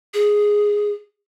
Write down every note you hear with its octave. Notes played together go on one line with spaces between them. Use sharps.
G#4